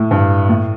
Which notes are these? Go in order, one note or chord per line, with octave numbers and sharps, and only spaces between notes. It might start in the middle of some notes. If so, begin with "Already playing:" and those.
Already playing: A2
G2
A2